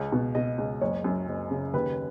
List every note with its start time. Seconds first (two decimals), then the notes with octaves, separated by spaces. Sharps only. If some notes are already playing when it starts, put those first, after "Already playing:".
Already playing: C#2 C#5
0.12 B2
0.35 B2 D#5
0.58 C#2
0.81 F#1 C#5
1.04 F#2
1.27 F#1
1.51 C#3
1.74 D#2 B4